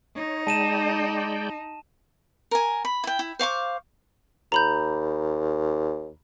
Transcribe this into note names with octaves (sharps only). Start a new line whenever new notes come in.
D#4 C#5
G#3 D5 G5 A5 D#7 E7
A#4 G#5
B5
E4 G5
E4
C5 F5 C#6 D6
D#2 A#5 B5 G6